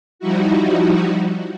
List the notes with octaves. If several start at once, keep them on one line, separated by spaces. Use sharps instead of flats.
F3 G3 D#4 E4 F#4